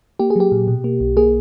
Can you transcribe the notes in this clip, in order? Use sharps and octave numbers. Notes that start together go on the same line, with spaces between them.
A#3 G4
G#4
F#3 G4
A#2
B2
A#3
B1
A#3 G#4